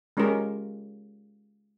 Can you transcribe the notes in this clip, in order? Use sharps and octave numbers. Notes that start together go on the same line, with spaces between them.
G#3 C#4 F4 G4 A#4